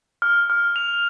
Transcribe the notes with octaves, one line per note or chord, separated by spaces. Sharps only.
F6
F6
F7